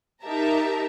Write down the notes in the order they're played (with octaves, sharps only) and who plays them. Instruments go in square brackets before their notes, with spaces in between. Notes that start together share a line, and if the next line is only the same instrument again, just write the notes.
[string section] D#4 G4 A#4 E5 A5 A#5